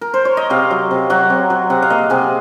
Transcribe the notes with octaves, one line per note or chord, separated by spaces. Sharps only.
A#4
C5
C#5
D#5
C3 F5
F#3
C3
F#3 F#5
C3
F#3
C3 F#5
F5
A#3 D#5
C3 G#4